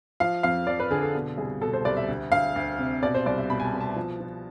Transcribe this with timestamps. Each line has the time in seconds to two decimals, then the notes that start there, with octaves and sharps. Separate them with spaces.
0.20 F3 F5
0.43 F2 F5
0.67 F2 D5
0.80 B4
0.90 D3 G#4
1.03 A4
1.15 B2
1.37 C2 G#4
1.61 B2 A4
1.73 C5
1.85 C2 D5
1.97 E5
2.08 D2
2.32 D2 F5
2.56 D2
2.79 C3
3.03 B2 D5
3.14 C5
3.26 C2 D5
3.38 E5
3.49 B2 B5
3.60 G#5
3.65 A5
3.74 B2
3.81 A5
3.96 F3
4.20 F3